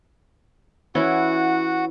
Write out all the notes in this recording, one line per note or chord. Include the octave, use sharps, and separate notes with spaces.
E3 C#4 E4 F#4 F#5